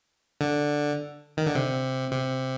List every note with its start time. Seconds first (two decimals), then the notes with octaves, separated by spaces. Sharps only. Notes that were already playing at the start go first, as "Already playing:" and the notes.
0.41 D3
1.37 D#3
1.46 D3
1.55 C3
2.12 C3